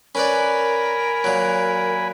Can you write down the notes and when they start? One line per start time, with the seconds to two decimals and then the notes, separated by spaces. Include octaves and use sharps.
0.15 C#4 A#4 B4 D5 G#5 B5
1.24 A#2 F#3